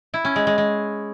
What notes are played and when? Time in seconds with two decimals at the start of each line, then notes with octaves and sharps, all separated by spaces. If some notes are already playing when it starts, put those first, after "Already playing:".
0.14 E4
0.25 C#4
0.36 G#3
0.47 G#3
0.58 G#3